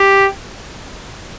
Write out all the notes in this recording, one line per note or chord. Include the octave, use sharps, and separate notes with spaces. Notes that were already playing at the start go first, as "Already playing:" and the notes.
Already playing: G4